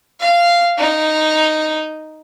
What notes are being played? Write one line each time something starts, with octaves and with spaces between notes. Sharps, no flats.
F5
D#4